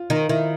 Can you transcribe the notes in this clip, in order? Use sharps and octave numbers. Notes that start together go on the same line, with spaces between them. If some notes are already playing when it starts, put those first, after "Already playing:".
Already playing: F4
D#3 D#4 D#5
D#3 E4 E5